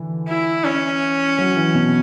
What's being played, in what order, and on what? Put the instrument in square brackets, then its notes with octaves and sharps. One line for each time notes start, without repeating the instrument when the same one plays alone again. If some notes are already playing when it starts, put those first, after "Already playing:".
Already playing: [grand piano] D3 E3
[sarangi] E4
C#4
[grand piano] F#3
E3
B2